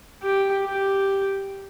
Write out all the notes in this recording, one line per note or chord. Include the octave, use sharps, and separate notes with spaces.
G4
G4